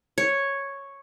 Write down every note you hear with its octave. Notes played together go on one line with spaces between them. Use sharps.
C#5